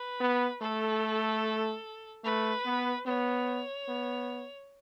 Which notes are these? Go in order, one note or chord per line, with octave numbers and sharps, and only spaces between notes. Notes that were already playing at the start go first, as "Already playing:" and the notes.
Already playing: B4
B3
A3 A4
A3 B4
B3
B3 C#5
B3